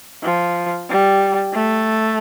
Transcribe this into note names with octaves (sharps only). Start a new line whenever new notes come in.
F3
G3
A3